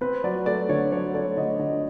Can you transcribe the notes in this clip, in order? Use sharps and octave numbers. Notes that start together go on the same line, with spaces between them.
C4 B4
F#3 D5
A3 D5
D3 C#5
F#3 C#5
A3 D5
D3 D#5
D3 D#5